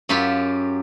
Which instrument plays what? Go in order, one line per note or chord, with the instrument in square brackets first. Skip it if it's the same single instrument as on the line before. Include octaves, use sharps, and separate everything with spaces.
[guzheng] F#2 F#3 F4 G4 B5